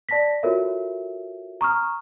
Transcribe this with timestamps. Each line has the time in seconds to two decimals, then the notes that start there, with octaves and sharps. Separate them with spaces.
0.09 D5 A5 A#6 B6
0.43 F4 F#4 A4 A#4 C#5 E5
1.61 A#5 C#6 D#6 F6